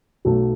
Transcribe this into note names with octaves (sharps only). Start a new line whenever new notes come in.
B1 B2 F#3 A3